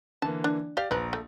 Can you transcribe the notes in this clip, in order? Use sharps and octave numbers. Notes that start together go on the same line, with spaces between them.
D3 E3 A#3 A5
D4
G4 D5 F5
A#1 F3 B4 A#5
A3